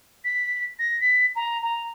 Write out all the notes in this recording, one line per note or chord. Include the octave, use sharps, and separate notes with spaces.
B6
A#6
B6
A#5
A#5